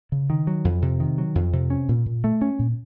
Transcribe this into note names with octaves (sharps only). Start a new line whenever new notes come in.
C#3
D#3
F#3
F2
C3
D#3
F#3
F2
C3
C#4
A#2
A#2
A3
C#4
A#2